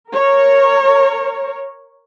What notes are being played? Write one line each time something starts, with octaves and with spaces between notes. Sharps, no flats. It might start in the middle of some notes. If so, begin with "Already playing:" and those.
A#4 C#5